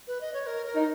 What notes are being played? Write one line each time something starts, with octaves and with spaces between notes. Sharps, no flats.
B4
D#5
C#5
A#4
A#4
D#4